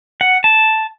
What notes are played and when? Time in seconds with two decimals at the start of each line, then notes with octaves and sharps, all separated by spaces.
0.21 F#5
0.44 A5